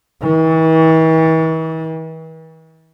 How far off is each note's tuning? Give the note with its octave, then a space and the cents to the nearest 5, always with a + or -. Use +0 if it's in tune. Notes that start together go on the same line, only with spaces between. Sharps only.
E3 -40